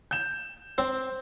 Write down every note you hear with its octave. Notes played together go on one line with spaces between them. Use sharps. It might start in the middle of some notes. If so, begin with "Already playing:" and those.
G6 E7
C4 C5